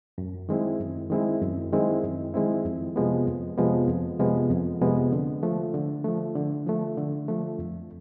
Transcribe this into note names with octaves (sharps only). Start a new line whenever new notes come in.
F#2
D#3 G#3 C4 E4
F#2
D#3 G#3 C4 E4
F#2
D#3 G#3 C4 E4
F#2
D#3 G#3 C4 E4
F2
C3 F3 G#3 B3
F2
C3 F3 G#3 B3
F2
C3 F3 G#3 B3
F2
C3 F3 G#3 B3
D3
F3 A3
D3
F3 A3
D3
F3 A3
D3
F3 A3
F2